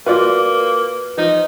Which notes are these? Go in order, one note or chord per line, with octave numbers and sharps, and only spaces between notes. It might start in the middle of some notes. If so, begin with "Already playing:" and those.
A#3 F4 F#4 B4 D5
F3 D#4